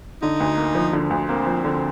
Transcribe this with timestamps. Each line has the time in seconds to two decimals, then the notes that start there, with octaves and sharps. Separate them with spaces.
0.22 D3 D#4
0.40 D2
0.57 A#3
0.75 F3
0.93 D3
1.10 D2
1.28 A#3 C4
1.47 F3
1.65 D3